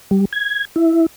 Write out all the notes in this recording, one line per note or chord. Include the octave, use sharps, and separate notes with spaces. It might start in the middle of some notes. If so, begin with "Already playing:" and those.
G3
G#6
E4